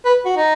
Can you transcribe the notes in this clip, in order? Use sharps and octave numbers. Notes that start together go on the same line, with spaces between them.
B4
F#4
D#4